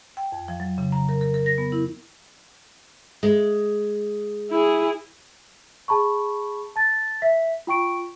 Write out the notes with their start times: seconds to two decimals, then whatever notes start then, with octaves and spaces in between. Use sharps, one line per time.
0.17 G5
0.32 F2
0.48 F3
0.60 F#3
0.78 C#3
0.92 A#5
1.09 A#4
1.21 A#4
1.34 A#4
1.46 A#6
1.58 B3
1.72 E4
3.23 G#3
4.51 E4 G#4
5.88 G#4 A5 B5 C#6
6.76 A5 A6
7.22 E5 B6
7.67 F4 G5 C#6 D7